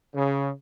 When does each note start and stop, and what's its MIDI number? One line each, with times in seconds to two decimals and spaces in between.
0.15 0.48 49